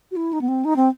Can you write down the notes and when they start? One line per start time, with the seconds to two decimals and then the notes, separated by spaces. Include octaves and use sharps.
0.11 F#4
0.16 E4
0.33 D#4
0.41 B3
0.48 C4
0.65 D#4
0.76 C4